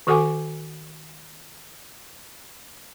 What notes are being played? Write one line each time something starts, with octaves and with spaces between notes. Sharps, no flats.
D#3 F#4 A4 F#5 G#5 D6